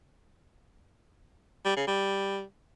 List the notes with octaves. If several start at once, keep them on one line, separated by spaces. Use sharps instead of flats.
G3
C#3
G3